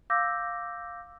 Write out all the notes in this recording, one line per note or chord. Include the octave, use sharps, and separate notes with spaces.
F5 D6 E6 G6 A#6